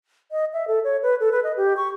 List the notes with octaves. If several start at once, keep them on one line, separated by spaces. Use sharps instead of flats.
D#5
E5
A4
C#5
B4
A4
B4
D#5
G4
C#6